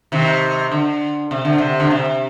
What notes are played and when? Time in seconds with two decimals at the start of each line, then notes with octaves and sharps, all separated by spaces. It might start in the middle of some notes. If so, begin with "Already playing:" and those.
0.12 C3 D#3
0.71 D3
1.31 C3
1.45 D3
1.58 C3
1.80 D3
1.90 C3